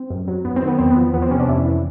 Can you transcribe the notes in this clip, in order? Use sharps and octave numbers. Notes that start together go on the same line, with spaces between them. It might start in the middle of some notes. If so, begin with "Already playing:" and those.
Already playing: C4
F#2
F#3
F#2 B3
C4
D#3
B3
E2 C4
B3
F3
E2 B3
C4
C3 C#4
D4
F2 E4
E3